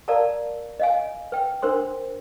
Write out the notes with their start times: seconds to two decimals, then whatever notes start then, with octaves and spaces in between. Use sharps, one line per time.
0.08 A#4 D5 F5 A5 A#5
0.80 D#5 F5 G#5
1.32 B4 G5
1.62 D4 A#4 C5 C6